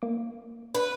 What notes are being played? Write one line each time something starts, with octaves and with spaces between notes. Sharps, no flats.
A#3 D6
D4 B4